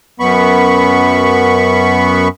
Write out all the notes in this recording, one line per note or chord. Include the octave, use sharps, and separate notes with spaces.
F#2 B3 B5 C#6